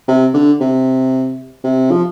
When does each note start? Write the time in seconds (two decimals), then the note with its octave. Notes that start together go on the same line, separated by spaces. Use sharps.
0.08 C3
0.34 D3
0.60 C3
1.64 C3
1.91 F3